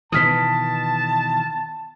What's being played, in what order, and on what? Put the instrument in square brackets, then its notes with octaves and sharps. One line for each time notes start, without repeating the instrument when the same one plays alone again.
[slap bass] B2 D#3 E3 [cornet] A5 [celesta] D#6 F6 B6